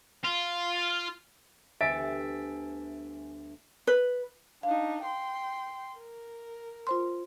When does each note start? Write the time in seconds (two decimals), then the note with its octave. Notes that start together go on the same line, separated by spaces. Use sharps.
0.24 F4
1.81 D2 G3 B3 E5 G#5 A6 D7
3.87 B4
4.63 D4 D#4 F5
5.02 G5 C6
5.97 A#4
6.87 F4 C5 C6